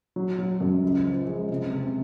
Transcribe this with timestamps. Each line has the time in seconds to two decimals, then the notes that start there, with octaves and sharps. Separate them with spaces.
0.16 F#3
0.38 F#3
0.61 F#2
0.83 C#2
1.05 F3
1.27 G#3
1.50 C3
1.72 C3